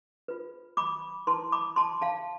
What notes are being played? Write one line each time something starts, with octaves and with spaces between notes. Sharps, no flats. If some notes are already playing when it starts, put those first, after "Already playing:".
F4 B4
B5 D6
E4 B4 A5 C6
B5 D6
A5 C6
F5 A5